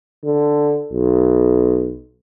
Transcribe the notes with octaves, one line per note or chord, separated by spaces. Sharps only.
D3
B1